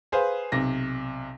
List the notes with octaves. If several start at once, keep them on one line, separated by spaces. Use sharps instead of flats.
G#4 B4 C5 F5
B1 C3 A#6